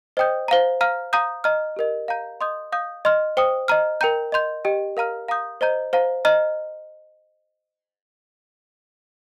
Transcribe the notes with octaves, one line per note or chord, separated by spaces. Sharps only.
C5 D#5 G5 D#6 G6
C5 F5 A#5
F5 A#5 F6
F5 A#5 D#6 G6
D#5 A#5 F6
G4 A#4 D#5
F5 A#5 G6
D#5 C6 D#6 G6
F5 D#6 G6
D#5 C6 F6
C5 G5 D#6
D#5 A#5 F6
A#4 G5 A#5 G6
D#5 C6 G6
G4 D#5 G5
A#4 F5 A#5 F6
F5 A#5 D#6 G6
C5 D#5 A#5 G6
C5 F5 A#5
D#5 A#5 F6